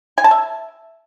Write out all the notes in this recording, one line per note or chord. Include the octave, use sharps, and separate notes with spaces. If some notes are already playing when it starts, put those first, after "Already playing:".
G#5
A5
E5